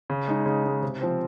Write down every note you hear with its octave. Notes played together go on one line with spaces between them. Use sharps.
C#3
G#3 D#4
C#3
G#3 D#4
C3
F3 C4